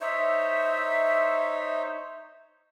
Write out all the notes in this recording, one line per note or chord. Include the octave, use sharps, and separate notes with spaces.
D#4 C5 C#5 E5